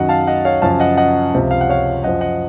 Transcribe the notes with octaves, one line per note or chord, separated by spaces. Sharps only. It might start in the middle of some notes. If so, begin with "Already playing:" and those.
Already playing: F#2 D#3 F#3 D#5 F#5
F5 A5
D#5 F#5
C#5 F5
F#2 C#3 F3 F5 A5
D#5 F#5
D#5 F#5
C#2 C3 F3
F5
F#5
C#5 F5
F#2 F3 D#5 F#5
D#5 F#5